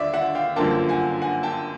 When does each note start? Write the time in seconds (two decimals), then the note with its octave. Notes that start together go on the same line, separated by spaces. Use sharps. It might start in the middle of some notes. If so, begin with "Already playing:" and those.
Already playing: D#2 D3 D5 E5
0.14 E5 F#5
0.35 F5 G5
0.56 G1 F#2 D3 F3 A#3 G5 A5
0.89 F#5 G#5
1.22 F#5 G#5
1.43 G5 A5